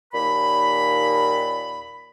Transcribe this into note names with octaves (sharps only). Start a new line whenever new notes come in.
D#2 A#2 B5